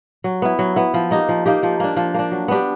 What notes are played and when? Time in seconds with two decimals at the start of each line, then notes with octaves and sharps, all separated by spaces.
0.24 F#3
0.42 B3 E4
0.59 F#3
0.76 B3 E4
0.94 F3
1.11 A#3 D#4 G4
1.29 F3
1.46 A#3 D#4 G4
1.63 F3
1.80 A#3 D4
1.96 F3
2.14 A#3 D4
2.32 F#3
2.48 B3 D4 G4